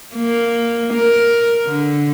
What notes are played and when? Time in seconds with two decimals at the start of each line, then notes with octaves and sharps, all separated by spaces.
0.15 A#3
0.94 A#4
1.67 D3